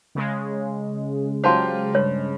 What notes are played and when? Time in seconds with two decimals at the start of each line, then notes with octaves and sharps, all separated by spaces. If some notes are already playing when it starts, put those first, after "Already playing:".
0.15 C#3 G#3
1.44 F#3 F4 G4 C5 A5 C6
1.95 G2 C#5